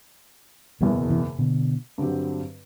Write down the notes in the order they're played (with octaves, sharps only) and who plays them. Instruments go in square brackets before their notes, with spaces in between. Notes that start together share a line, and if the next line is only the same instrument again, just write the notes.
[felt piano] F#1 E2 B2 [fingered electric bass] E3 G3
[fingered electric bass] C3 E3
B2 D3
[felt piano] G2 D3 F#3 C4 G4